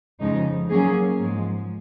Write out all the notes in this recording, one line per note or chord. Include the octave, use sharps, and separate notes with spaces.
F2 C#3 F3 G#3 D#4
F#3 A#3 C#4 G#4
G#2 F3 G#3